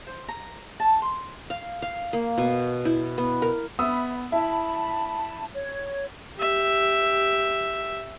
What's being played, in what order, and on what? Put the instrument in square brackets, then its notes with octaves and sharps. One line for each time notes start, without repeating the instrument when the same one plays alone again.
[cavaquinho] C5
A#5
A5
C6
[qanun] F5
F5
A#3
B2
E4
B3
A#4
[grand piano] B3 D#6 E6 [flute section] E5 B5
[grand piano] E4 [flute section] A5 B5
[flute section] C#5
[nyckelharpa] G4 E5